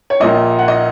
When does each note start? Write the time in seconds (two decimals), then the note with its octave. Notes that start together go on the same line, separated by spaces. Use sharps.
0.10 C#5
0.20 A#1 A#2 A#3 D#5
0.59 F#5
0.68 D#5